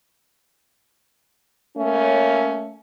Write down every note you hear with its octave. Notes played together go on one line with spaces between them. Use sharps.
A3 A#3 C#4